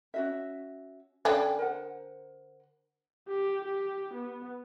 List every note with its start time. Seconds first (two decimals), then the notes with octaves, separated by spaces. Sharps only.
0.14 C#4 F#4 E5
1.25 D3 C#4 D5 G5
1.59 A#4 C5 F#5
3.28 G4
3.64 G4
4.14 B3